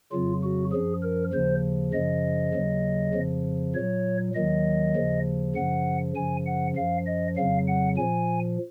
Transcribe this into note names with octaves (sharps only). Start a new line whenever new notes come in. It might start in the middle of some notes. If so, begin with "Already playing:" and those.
F2 C#3 F#3 F4
F#4
F#2 F3 G#4
A#4
D#2 C#3 F3 C5
F#2 C#3 F3 D#5
D#2 C#3 F#3
F2 C#3 F3
A#2 F#3 C#5
D#2 D#3 F#3 D#5
D#2 C#3 F3
F#2 C#3 F3 F#5
F#2 C#3 F3 G#5
F#5
F#2 F3 F5
D#5
F2 C#3 F#3 F5
F#5
A#2 F3 G#5